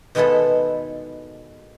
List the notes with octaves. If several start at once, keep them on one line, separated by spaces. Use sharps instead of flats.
B2 D#3 G#3 B3 E4 A4